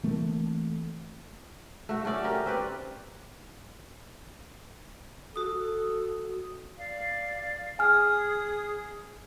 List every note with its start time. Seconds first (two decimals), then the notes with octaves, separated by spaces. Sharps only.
0.03 E3 A3 A#3 C4
1.89 A3 F#4
2.05 A3 C#4 D5
2.24 C#4 G4 A#4
2.46 C4 B4 D5
5.36 F#4 A4 D#6
6.78 D5 F5
7.79 G#4 G#5 D#6 F6